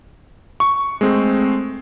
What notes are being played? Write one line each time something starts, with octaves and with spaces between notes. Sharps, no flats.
C#6
G#3 A3 C4